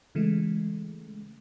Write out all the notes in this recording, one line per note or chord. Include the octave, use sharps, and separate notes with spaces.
C#3 E3 G#3 A3